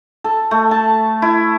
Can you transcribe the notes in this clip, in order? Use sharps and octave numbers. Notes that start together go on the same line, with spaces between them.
A4
A3
A5
E4